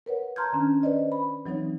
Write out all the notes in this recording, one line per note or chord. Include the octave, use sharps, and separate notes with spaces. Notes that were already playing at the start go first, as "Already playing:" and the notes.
A#4 B4 C#5 F#5
A5 A#5 C6 F6 G6 G#6
D#3 C#4 D4
B4 C5 D5 D#5
B5
E3 F#3 C4 D#4 C#5